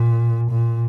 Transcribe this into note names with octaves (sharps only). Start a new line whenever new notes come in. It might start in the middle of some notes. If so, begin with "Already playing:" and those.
Already playing: A#2
A#2